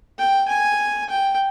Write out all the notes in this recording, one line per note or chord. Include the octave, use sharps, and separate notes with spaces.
G5
G#5
G5